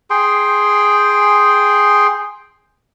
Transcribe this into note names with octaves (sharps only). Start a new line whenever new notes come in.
G#4 G5 C6